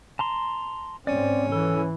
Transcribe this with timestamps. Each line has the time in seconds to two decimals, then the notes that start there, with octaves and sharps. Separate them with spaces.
0.19 A5 A#5 C6
1.07 G#2 C4 C#4 D5
1.52 E3 A4